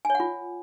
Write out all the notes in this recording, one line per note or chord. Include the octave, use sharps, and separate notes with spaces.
G#5
C#5
F#5
F4